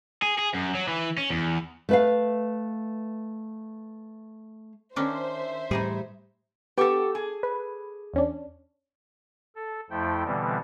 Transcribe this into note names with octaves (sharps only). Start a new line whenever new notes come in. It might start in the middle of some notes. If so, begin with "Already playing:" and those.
G#4
G#4
F#2
F#3
E3
C#4
E2
A3 B4 F5
D#3 C#4 D4 C5 E5
A2 E3 G3 D#4 G#4
B3 G4 A4 C#6
G#4
B4
E2 C#4 D4
A4
F2 F3 A3 E4 G5
B2 D3 E3 G3 B3 C4